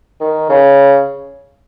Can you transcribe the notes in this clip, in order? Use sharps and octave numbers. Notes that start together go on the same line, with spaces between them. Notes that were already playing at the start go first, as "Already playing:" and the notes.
D#3
C#3